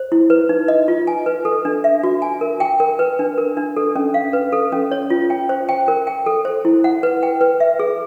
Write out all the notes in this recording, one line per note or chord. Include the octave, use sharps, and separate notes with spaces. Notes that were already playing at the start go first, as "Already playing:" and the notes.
Already playing: C5
E4
B4
D#4
D#5
F4
G#5
B4
A4
D4
E5
F#4
G#5
A#4
G5
A#4
B4
D4
A#4
D4
A4
C#4
F5
B4
A4
C#4
C#5
F4
G5
C5
G5
A#4
G5
A4
C5
E4
F#5
B4
G5
B4
E5
G#4